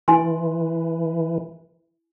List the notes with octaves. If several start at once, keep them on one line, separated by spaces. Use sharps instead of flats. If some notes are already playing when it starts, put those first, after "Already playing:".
E3 E4 G#5 C6